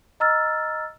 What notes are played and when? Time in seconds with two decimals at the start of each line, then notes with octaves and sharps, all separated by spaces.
0.20 D#5 A#5 E6 F6 A6